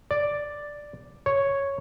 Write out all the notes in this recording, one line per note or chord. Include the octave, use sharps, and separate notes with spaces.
D5
C#5